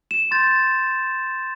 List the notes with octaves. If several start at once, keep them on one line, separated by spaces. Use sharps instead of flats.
E7
C6 G6 A6